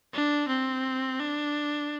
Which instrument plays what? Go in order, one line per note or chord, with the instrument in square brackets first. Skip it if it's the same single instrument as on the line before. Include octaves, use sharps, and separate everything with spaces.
[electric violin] D4
C4
D4